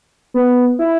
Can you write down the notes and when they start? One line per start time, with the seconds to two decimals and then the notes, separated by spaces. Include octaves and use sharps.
0.34 B3
0.79 E4